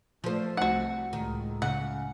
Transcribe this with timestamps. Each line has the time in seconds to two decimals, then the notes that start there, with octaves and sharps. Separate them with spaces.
0.24 F3 A3 C5
0.57 C2 A3 F#4 F#5
1.13 C#2 A2 D#3
1.62 C#3 F#5